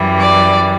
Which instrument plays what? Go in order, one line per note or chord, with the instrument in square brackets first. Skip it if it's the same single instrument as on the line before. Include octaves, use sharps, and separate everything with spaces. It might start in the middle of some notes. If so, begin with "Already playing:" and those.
Already playing: [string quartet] F#2 E3 G3
D5